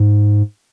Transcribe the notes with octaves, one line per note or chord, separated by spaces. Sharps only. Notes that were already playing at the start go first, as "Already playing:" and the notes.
Already playing: G#2